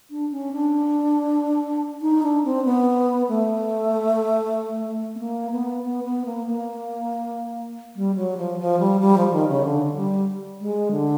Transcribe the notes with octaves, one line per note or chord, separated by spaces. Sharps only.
D4
C#4
D4
D#4
D4
C4
B3
A3
B3
A#3
B3
B3
B3
A#3
A#3
G3
F#3
F3
F3
G3
G3
F3
D#3
C#3
D3
G3
G#3
D3